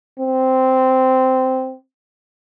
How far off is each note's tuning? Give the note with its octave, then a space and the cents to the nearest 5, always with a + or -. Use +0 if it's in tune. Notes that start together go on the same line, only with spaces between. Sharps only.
C4 -10